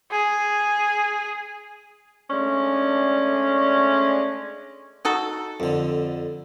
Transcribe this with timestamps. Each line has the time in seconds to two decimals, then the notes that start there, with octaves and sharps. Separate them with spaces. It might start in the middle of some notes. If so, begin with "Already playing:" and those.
0.11 G#4
2.30 G#3 A3 C#4 D4 D5
5.05 D#4 F#4 A4
5.60 F2 D3